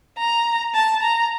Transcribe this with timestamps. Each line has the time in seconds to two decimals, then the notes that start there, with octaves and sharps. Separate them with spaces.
0.19 A#5
0.74 A5
1.03 A#5